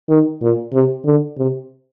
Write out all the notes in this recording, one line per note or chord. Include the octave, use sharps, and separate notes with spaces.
D#3
A#2
C3
D3
C3